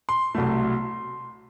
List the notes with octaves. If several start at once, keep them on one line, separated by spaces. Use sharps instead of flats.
C6
C2 B2 F#3 A3